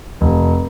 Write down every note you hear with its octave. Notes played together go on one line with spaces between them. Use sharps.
F1